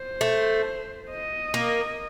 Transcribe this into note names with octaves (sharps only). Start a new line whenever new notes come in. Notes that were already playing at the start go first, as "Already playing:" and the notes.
Already playing: C5
A3
D#5
A#3